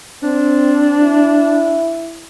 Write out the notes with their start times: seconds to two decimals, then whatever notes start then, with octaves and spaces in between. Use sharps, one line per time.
0.23 C4 D4
1.02 E4